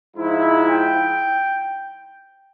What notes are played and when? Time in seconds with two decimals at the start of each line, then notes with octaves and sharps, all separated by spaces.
0.16 G#2 F3 G#3 E4
0.68 G5